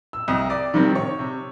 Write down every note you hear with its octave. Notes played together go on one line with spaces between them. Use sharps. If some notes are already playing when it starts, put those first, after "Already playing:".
E6
C2 D#5 D#6
D5 D6
C3 D#3 G3 C4
C#5 C#6
C3